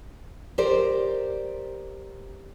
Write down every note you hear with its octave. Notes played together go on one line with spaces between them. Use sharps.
G4 A#4 C5 D5